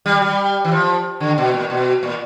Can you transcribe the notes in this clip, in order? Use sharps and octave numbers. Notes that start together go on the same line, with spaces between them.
G3
G3
E3
F3
D3
B2
A#2
B2
A#2